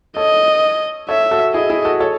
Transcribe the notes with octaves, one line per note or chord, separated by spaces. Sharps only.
A4 C#5 D#5
A4 C#5 E5
F#4 A4
E4 G#4 D#5
E4 G#4
F#4 A4
A4 C#5